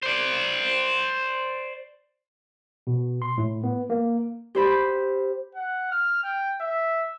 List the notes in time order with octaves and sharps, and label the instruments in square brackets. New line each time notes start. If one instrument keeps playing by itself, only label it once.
[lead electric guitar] C5 D5
[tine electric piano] B2
C6
A2
B3
A#3
[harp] G4 C5 B5
[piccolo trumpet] F#5
F6
G5
E5